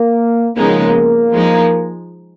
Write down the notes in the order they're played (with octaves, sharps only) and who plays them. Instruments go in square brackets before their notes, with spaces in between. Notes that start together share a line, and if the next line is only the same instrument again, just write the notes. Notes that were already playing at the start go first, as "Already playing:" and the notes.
Already playing: [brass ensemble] A#3
[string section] C#3 F3 G#3 B3 D#4 [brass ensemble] A#3
[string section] F3 G#3 D#4